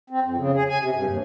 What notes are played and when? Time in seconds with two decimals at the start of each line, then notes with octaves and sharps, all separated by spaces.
0.10 C4
0.24 F2
0.37 C#3
0.55 G#4
0.69 G#5
0.80 C3
0.93 G2
1.07 D#2